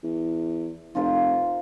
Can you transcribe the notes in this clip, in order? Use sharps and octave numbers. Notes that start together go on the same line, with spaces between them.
E2
F1 F4 A#4 C5